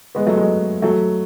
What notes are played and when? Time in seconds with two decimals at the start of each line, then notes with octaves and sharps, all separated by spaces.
0.15 G#3 B3
0.27 F#3 A3
0.37 G#3
0.82 F#3 A3